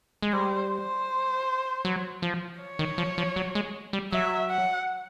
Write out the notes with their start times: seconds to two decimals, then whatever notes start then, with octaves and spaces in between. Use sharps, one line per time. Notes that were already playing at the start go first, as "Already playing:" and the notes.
0.22 G#3
0.33 G3 C5
0.71 C5
1.85 F#3
2.22 F3
2.61 C#5
2.79 D#3
2.98 F3
3.18 F3
3.36 F#3
3.55 G#3
3.93 G3
4.12 F#3 E5
4.50 F#5